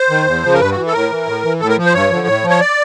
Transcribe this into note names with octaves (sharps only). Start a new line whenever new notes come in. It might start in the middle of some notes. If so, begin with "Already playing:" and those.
Already playing: C5
D#3
E2
C#3 F3
A#4
G2 B4
E3 F#4
A4
A2 A#4
E3
A2
E3
A2 A4
A#4
F3
C5
G2 C#5
D3 F3
A2
F3
C#5
D5